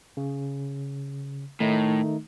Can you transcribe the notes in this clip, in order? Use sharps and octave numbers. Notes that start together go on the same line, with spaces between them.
C#3
A2 D#3 A3 D#4